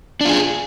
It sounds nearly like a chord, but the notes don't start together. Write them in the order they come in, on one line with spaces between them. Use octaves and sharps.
D4 F4 G#4